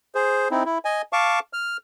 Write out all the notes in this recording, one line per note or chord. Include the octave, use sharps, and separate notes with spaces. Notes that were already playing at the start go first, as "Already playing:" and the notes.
G#4 C5
C4 D#4 E4
E4
D#5 G#5
F5 A5 C#6 D6
F6